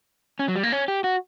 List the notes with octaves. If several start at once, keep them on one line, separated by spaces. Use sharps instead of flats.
C#4
F#3
G3
A#3
C#4
G4
F#4